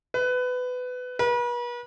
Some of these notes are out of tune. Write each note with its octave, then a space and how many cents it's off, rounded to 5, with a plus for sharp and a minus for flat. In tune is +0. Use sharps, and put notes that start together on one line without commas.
B4 +20
B4 -40